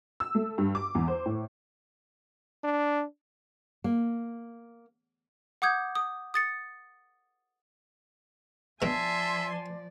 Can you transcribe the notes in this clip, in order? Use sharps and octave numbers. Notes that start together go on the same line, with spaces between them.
E6
A3
G2
D6
E2
C5
A2
D4
A#3
F#5 D6 D#6 G6 G#6
D#6
D#6 A6 C#7
G2 B2 F3 D5 E5 G#5 A5 C6